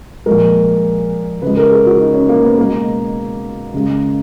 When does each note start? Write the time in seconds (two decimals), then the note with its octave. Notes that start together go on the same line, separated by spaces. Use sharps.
0.26 A#2 F3 G#3 A#4
1.42 C#3 G#3 B4
1.57 A#4
1.71 G#4
1.86 F#4
2.00 D#4
2.14 C#4
2.29 A#3
2.43 B3
2.58 B2 G#3 A#3
3.74 C#3 G#3